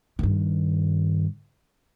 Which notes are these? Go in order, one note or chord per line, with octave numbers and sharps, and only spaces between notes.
G2 D#3